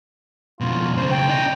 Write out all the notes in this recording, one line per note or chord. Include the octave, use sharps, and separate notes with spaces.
F2 B2 F4
B1 C#3 C5
G5
D4 D#5